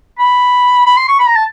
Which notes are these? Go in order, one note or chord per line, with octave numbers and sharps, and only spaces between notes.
B5
B5
C6
C#6
B5
A#5
A5